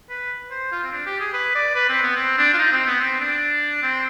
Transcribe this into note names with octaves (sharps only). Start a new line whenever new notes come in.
B4
C5
F4
C4
D4
G4
G#4
B4
D5
B4
C4
B3
C4
D4
F4
D#4
C4
B3
C4
D4
C4